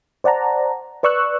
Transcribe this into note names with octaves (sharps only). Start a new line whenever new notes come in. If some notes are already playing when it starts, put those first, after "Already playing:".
C5 D5 F#5 A5 A#5
B4 D5 C#6 E6 F#6